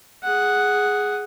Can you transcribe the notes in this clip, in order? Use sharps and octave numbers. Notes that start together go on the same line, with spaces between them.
G#4 F#5